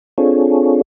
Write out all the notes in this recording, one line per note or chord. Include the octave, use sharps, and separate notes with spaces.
C4 D4 F4 G#4 A4 C#5